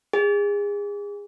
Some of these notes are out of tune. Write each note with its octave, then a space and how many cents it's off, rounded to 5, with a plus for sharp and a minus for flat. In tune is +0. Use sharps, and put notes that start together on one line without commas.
G#4 -30